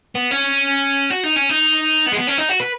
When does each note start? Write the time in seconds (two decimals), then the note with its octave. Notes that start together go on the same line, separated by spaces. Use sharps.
0.15 B3
0.31 C#4
1.10 F#4
1.24 D#4
1.36 C#4
1.49 D#4
2.07 B3
2.13 G#3
2.17 B3
2.28 C#4
2.39 D#4
2.49 F#4
2.60 B4